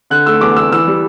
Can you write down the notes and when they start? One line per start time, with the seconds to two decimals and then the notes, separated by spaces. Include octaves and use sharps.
0.10 D3 F#6
0.26 A3 E6
0.41 E2 D6
0.56 E2 E6
0.72 E3 E6
0.87 G3